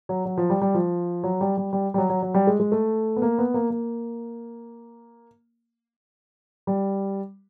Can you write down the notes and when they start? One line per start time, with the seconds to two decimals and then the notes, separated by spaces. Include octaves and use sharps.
0.09 F#3
0.25 F#3
0.38 F3
0.50 G3
0.62 G3
0.74 F3
1.24 F#3
1.41 G3
1.57 G3
1.73 G3
1.94 G3
1.98 F#3
2.10 F#3
2.22 F#3
2.34 G3
2.47 G#3
2.60 G#3
2.72 A3
3.16 B3
3.22 A#3
3.38 B3
3.54 A#3
3.70 A#3
6.67 G3